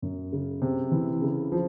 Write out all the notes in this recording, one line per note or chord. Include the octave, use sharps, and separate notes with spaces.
F#2
C#3
C3
E3
C#3
F3